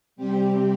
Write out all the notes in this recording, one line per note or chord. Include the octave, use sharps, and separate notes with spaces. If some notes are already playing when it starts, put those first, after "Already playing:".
C3 G3 C4 G4